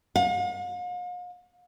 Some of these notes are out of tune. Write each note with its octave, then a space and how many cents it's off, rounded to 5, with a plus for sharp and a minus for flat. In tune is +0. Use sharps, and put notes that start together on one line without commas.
F5 +45